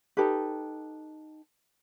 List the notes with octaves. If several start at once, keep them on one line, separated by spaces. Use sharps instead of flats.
D#4 G4 A4 B4